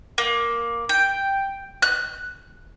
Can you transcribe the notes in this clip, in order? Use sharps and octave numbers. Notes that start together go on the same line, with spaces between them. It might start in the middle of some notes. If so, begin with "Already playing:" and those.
A#3
G5
F#6